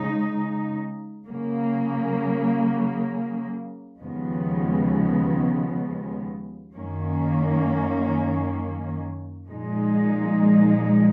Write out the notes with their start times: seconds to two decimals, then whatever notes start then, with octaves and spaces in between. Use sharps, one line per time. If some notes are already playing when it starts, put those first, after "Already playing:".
Already playing: C#3 G#3 D#4
1.26 C#3 F#3 A#3
4.00 D#2 C#3 F3 G#3 B3
6.74 F#2 D#3 A#3 C#4
9.48 A#2 F3 G#3 D#4